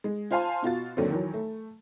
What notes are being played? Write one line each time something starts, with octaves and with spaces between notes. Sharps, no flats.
G#3
F4 C5 F5 G#5 A5 C6
B2 F4 F#4 A6
D#2 D3 F#3 C4
D#3 E3 F#3
A3